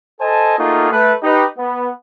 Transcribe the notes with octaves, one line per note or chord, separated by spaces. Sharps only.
A4 C5 D#5 G#5 A5
A3 A#3 D#4 F4 F#4 G#4
A3 B4
D#4 G4 B4
B3